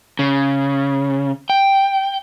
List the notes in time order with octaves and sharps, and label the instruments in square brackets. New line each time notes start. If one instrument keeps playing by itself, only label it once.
[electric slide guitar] C#3
G5